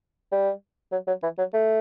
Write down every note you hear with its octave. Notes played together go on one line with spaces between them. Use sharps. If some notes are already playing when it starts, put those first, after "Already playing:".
G3
F#3
F#3
E3
F#3
A3